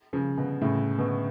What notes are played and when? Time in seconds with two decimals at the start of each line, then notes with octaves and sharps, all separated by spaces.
0.13 C#3 F3
0.37 B2 D3
0.61 A2 C#3
0.98 B2 D3